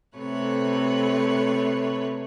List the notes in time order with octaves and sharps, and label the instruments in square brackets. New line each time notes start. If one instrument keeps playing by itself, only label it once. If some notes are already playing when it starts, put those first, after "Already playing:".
[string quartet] C3 A3 A4 B4 C#5 F#6